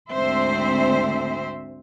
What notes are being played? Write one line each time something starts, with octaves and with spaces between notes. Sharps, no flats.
D2 G#2 C4 C5 E5